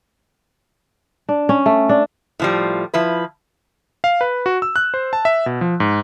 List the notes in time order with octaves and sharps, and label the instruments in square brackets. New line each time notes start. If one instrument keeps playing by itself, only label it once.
[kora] D4
C#4
A3
D4
[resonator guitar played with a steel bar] A2 F3 G3
F3 E4 B4
[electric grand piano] F5
B4
F#4
E6
F#6
C5
A5
E5
B2
F3
G#2